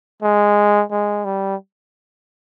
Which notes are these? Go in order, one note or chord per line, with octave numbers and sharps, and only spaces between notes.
G#3
G#3
G3